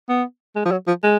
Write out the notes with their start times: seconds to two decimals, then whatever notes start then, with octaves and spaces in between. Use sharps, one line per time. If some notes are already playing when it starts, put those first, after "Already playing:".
0.09 B3
0.56 G#3
0.65 F3
0.72 F#3
0.87 F3
1.03 G#3